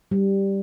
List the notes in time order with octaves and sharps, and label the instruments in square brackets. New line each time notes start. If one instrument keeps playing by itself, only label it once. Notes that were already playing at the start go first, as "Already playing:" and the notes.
[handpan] G3